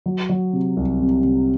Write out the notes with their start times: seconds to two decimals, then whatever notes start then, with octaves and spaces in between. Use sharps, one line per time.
0.06 F#3
0.29 F#3
0.53 C3
0.77 C2
1.00 C3
1.24 C3